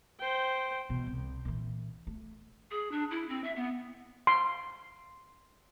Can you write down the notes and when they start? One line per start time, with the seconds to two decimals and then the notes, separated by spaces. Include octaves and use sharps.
0.19 C5 G5
0.90 B2 E3
1.06 C2
1.45 A#2 E3
2.07 A3
2.71 G#4
2.91 D4
3.11 E4
3.29 C4
3.44 E5
3.56 B3
4.27 C6